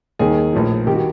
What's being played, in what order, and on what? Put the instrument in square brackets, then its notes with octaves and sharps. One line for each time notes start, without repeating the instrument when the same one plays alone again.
[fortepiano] D#2 D#3 G#4
A#1 A2 F3
D#3 G4
F#4